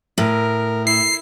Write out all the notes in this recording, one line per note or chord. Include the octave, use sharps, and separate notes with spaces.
A2 A#4
E4 C7